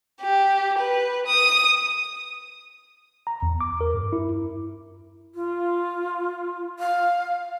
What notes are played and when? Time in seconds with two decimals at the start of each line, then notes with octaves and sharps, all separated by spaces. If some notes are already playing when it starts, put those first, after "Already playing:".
0.22 G4
0.79 B4
1.26 D#6
3.27 A#5
3.43 E2
3.61 D6
3.81 A#4
3.95 G2
4.13 E4
5.35 F4
6.79 F5